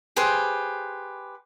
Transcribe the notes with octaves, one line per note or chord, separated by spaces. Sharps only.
G4 G#4 B4 C5